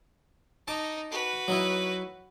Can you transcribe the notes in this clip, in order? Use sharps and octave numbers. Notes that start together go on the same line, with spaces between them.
D#4 A5 D6
F#4 B4
F#3 D#4 E4